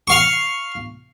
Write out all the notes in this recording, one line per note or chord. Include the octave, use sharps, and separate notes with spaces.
F5 C#6